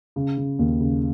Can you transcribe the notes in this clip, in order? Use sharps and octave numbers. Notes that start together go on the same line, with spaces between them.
C#3
C#3
D#2
C#3